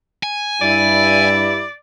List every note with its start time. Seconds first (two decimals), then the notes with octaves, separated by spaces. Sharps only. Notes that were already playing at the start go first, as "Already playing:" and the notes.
0.23 G#5
0.61 G2 E4 D5